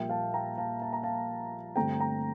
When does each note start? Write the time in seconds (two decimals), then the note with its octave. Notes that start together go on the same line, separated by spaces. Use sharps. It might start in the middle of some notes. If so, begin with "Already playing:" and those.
Already playing: A#1 A#2 G3 A#3 E5 G5
0.09 F5 A5
0.34 G5 A#5
0.58 F5 A5
0.82 A5
0.93 A#5
1.03 F5 A5
1.76 G2 D3 A3 C4 G5 A#5
2.00 G5 A#5